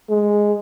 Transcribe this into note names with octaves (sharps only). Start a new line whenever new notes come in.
G#3